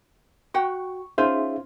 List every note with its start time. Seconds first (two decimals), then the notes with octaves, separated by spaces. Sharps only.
0.54 F#4 F#5 G5 C#6
1.18 C#4 D#4 F4 G#4 C5 E5